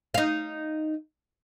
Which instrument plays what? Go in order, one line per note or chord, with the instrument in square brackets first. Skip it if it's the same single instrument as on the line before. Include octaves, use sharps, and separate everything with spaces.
[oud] D#4 F5